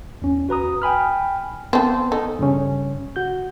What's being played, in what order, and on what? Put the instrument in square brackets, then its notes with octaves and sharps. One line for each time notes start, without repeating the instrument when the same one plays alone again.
[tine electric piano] E2 C#4
F#4 B4 A#5 D#6
G5 G#5 B5 F6
[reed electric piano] B3 [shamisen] C4 A4
[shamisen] D#4 [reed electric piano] A4
[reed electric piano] G2 C#3 C#4
F#4 G6